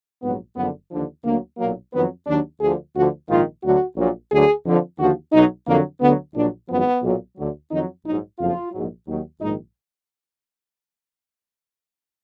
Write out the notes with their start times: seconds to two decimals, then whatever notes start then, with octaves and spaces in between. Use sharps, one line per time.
0.22 A#1 G#2 F#3 B3
0.56 F#1 F#2 D3 F3 B3
0.91 D#2 D3 F3 D4
1.25 D2 D3 F#3 A#3
1.58 B1 A#2 F#3 A#3
1.93 F2 D#3 F#3 B3
2.27 D#2 D#3 F#3 D4
2.61 D2 D3 F3 G#4
2.94 D2 D3 F3 F#4
3.29 A#1 G#2 D#3 F4
3.63 D2 D3 F#3 F#4
3.97 A#1 A#2 F#3
4.30 D2 D3 F#3 G#4
4.65 F2 D3 F3
4.99 D#2 D3 F3 F#4
5.33 B1 B2 F#3 D#4
5.67 F2 D3 F#3 A#3
6.01 D2 D3 F#3 B3
6.35 A#1 A#2 F#3 D4
6.69 G#1 F#2 F3 B3
7.03 B1 A#2 F#3
7.37 D2 D3 F#3
7.71 F2 D#3 F#3 D#4
8.05 A#1 G#2 F#3 D#4
8.39 F#1 F2 F3 F4
8.73 A#1 G#2 F#3
9.08 D#2 D#3 F#3
9.41 A#1 G#2 D#3 D#4